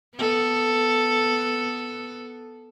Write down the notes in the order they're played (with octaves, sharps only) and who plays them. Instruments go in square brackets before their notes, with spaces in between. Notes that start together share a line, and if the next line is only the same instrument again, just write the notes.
[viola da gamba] B3 A4